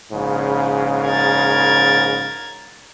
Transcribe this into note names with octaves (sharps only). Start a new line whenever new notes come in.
A#1 G#2 C#3
A#4 G#6 A6